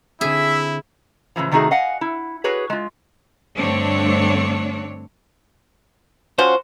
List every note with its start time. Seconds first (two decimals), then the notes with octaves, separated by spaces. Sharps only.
0.21 D3 C4 E4 G#4 E5
1.36 A2 C#3 E3 F3
1.51 C3 D#3 A3 D#4 F#4 G#4
1.71 D#5 F5 F#5 G#5
2.01 E4
2.44 F#4 G#4 B4 C#5
2.70 G#3 F4
3.56 G2 D3 A3 C4 D4 C#5
6.38 F3 C#4 F#4 C5